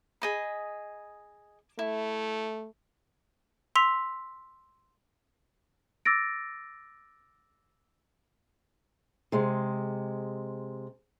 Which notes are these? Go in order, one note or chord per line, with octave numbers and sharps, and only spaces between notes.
G#4 D#5 B5
A3 E4
C6 E6 B6 F7
D6 E6 A6 A#6 D7
C3 G#3